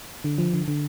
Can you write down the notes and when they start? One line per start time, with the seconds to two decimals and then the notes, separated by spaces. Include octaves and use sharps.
0.24 D3
0.38 F3
0.54 D3
0.68 D3